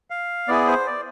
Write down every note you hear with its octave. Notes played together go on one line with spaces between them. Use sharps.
F5
B3 E4 G#4 D5
C5
D5